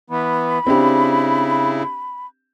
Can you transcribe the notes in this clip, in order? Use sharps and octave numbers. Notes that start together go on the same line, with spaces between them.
E3 B3 B5
C#3 C4 D4 E4 G4